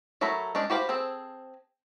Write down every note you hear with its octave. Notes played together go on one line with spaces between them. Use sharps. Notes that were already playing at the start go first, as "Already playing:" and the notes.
F#3 A3 A#4 C#5 B5
G#3 C#4 D4 G4
F#4 G4 B4 C5 F5
C4 G#4 A4 C5